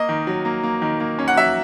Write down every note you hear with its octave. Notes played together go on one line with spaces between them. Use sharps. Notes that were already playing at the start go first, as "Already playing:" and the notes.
Already playing: A#3 D#5
D#3
F#3
A#3
A#3
D#3
A#3
C#4
F#5
F#3 E5